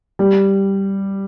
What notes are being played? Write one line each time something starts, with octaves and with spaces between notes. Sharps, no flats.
G3